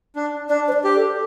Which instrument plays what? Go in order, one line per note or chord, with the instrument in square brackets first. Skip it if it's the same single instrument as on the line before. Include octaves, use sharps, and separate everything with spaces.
[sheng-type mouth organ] D4
[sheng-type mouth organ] D4 [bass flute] D5
[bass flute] C5
D5
[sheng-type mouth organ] G4
[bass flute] A4